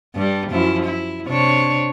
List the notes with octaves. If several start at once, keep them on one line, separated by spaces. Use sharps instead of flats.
G2 G3
F#2 F3 E4
E4
C3 D4 C#5